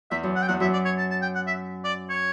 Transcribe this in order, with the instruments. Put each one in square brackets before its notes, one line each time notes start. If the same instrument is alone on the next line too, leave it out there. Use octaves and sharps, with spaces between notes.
[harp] E2 [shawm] E5
[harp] F#2
[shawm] F#5
G5
[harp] E2 [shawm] F#5
[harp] F#2 [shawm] E5
[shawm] D5
C#5
A5
A5
G5
F#5
E5
D5
C#5